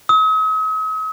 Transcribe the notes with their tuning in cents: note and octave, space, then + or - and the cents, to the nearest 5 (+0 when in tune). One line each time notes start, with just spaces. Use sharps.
D#6 +45